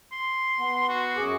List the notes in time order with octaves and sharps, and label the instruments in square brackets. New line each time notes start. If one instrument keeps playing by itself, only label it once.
[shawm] C6
[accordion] B3
[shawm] F#4
[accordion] F#2 G#4 D6